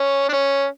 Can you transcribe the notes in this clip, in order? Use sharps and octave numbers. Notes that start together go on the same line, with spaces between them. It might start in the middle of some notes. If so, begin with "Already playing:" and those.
Already playing: C#4
D4
C#4